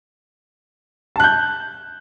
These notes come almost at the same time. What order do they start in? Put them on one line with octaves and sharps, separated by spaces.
A5 F#6 G6